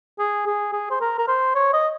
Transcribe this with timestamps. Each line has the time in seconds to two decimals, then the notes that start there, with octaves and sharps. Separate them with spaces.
0.19 G#4
0.46 G#4
0.73 G#4
0.91 C5
1.01 A#4
1.19 A#4
1.28 C5
1.55 C#5
1.73 D#5